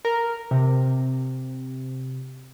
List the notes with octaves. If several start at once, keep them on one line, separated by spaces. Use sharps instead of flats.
A#4
C3